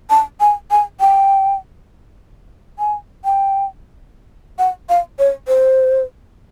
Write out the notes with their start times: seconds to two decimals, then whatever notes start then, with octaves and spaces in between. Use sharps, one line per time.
0.10 A5
0.40 G#5
0.71 G#5
1.00 G5
2.79 G#5
3.24 G5
4.59 F#5
4.89 F5
5.19 C#5
5.48 C5